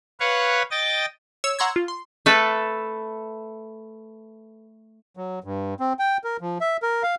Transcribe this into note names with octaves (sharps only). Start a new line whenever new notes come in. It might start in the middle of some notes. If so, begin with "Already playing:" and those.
B4 C#5 F5 F#5
D#5 G5 A6
C#5 E6
F#5 A#5 C6 C#6 E6 G#6
F4
C6
A3 A4 B4
F#3
G2
C4
G5
A#4
F3
E5
A#4
F5